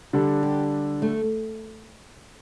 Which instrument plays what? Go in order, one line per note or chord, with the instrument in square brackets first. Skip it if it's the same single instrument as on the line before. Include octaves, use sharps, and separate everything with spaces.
[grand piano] D3 G3 D4 A4
[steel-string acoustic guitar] G4
A3